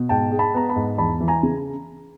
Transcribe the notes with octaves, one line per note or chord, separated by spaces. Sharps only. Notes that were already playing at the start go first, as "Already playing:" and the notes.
Already playing: B2
G#2 G5 A5
G#3
A5 B5
B3 A#5
A5 B5
G#2
E2 A5 B5
E3
G#5 A#5
C#3